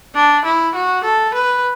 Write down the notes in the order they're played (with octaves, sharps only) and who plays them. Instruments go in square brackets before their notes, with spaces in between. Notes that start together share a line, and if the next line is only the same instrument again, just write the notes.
[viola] D4
E4
F#4
A4
B4